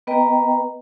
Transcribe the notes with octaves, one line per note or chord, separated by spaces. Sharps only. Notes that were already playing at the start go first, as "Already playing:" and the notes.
B3 B4 D#5 G5 A#5